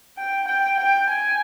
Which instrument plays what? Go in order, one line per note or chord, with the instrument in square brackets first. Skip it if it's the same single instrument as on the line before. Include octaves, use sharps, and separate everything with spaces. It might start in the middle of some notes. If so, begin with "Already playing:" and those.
[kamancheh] G5
G5
G5
G#5